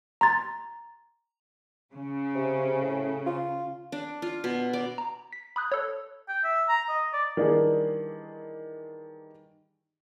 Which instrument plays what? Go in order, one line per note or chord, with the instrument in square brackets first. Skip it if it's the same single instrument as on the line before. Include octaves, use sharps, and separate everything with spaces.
[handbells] A#5 C6 A6
[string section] C#3
[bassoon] C3
A2
F4
[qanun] D4
F4
B2
D5
[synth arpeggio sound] A#5
B6
B5 D#6 F#6 G6
A4 C#5
[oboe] G5
E5
A#5
D#5
D5
[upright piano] D#3 E3 G3 A#3 D4 G#4